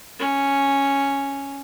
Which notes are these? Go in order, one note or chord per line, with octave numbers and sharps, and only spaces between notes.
C#4